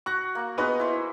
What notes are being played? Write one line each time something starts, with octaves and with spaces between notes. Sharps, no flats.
F#4 C#6 F#6 A#6
A#3 F#5
B3 D#4 F4 F#4 G#4 B4
E4 C5